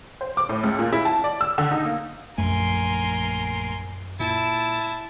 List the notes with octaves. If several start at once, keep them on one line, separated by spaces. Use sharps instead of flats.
C5
D6
A2
C#2
A#2
E4
A5
D5
E6
D3
D#4
A#3
A#1 F#2 A3 A#4 G#5 C6
A#2 E4 A5